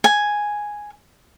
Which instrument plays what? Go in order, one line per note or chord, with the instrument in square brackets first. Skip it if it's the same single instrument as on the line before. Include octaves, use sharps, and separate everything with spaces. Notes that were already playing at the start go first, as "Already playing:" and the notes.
[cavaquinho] G#5